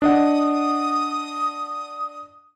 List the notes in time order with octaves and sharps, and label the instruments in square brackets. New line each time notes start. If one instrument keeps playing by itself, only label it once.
[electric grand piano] D4 D#5 F#5 [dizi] D#6